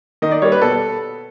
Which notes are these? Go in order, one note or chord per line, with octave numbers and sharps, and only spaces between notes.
D#3 D#5
D5
G3 A#3 C#5
B4
B2 A4